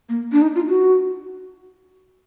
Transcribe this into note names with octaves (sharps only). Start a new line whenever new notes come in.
A#3
D4
D#4
F4
F#4